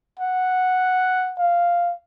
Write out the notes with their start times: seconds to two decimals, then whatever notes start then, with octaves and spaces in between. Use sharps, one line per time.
0.20 F#5
1.39 F5